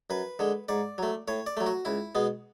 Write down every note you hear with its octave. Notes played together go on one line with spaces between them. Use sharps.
F#2 B4
D3 G#3
G#2 D5
F#3 A3
A2 C#5
D5
F#3 A3
F#4
C#2 E4
B2 G#3 B3